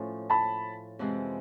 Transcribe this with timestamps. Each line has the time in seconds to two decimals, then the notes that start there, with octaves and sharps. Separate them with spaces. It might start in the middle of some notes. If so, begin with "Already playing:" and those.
Already playing: A2 F3 A3 C#4 F4
0.30 A5 B5
0.99 F2 C3 E3 G#3 C4